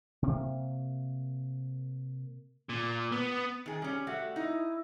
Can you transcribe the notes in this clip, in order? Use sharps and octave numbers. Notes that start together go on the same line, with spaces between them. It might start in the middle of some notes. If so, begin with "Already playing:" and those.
C3 A#3
A#2
B3
D#3 G#4
G3 C#4
G3 A3 F#4
D#4 E4